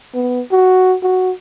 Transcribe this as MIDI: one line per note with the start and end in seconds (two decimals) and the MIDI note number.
0.14 0.41 59
0.51 0.96 66
1.03 1.31 66